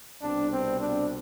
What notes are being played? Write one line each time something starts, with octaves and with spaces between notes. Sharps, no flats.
C2 B2 G3 C4 D4
C4
D4